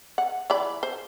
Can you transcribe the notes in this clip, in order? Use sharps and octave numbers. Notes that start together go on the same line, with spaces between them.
F#5
E3 D5 B5
C5